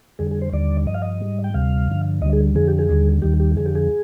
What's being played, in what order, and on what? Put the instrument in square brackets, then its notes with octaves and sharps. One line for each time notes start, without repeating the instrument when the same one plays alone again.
[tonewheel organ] F2 D3 G3 G#4
G#4
C5
D#2 D3 G3 D5
G2 F3 D#5
F5
D#5
G#2 G3
G5
D2 C3 G3 F5
G2 D3 F3
D2 D3 G3 D#5
G#4
F2 D3 F3 G#4
G4
G#4
D#2 D3 G3
D#2 D#3 G3 G4
G4
F2 D3 F3 G#4
G4
G#4